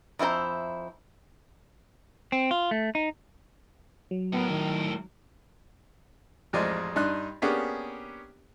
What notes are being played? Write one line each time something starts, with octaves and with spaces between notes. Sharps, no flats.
F2 E4 F4 C5 A#5
C4
F4
A3
D#4
F#3
A2 B3 A#4
D#3
A1 F2 G#3 C5 D5 D#5
G2 D4 D#4 C6 F#6
A#3 B3 C#4 D4 G4 G#4